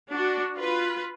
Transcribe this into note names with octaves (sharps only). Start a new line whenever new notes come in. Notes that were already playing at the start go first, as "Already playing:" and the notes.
D4 F#4
F4 B4